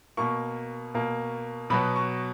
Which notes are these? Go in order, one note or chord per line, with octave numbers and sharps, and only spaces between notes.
B2 A#3 C#6
B2 A#3
B2 F#3 B3 B5
C#6